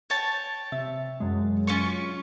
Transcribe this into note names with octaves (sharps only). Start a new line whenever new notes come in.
C#5 G5 A5
C3 E5 A6
F#2 G#3
C#4 F4 C#6